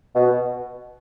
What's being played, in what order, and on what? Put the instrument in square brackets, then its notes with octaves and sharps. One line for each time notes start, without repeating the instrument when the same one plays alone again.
[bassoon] B2